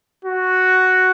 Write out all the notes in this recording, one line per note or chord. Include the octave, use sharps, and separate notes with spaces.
F#4